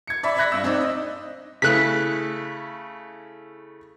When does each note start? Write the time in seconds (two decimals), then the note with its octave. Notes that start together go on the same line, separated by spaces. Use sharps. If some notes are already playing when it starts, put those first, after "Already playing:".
0.07 G#6 C#7
0.23 D5 E5 B5
0.36 D5 E5 B5 F#6 G#6 A#6
0.52 G2 E6
0.64 C4 D#4 D5
0.80 D#5
1.62 C#3 A3 E4 F#6 B6